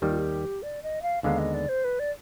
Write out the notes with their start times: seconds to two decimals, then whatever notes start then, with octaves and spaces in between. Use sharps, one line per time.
0.01 D#2 D#3 G3 G4
0.10 F4
0.18 G4
0.63 D5
0.83 D#5
1.02 F5
1.23 D#2 D3 G#3 B3 D#4 F5
1.38 D#5
1.54 D5
1.69 C5
1.84 B4
1.99 D5